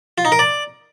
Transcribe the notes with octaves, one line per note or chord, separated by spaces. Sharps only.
F4
D#4
A#4
D5